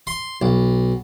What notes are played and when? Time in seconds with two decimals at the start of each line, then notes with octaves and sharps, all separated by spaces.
0.07 C6
0.42 B1